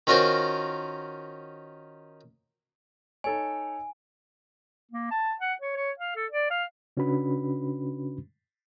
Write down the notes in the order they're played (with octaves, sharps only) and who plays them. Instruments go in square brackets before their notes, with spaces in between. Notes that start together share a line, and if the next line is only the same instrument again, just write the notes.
[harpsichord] D#3 C#4 F4 F#4 A#4 C5
[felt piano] D#4 A4 C#5 [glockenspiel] G#5
[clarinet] A#3
A5
F#5
C#5
C#5
F5
A4
D5
F5
[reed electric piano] C#3 C#4 D4 F#4 B4 B5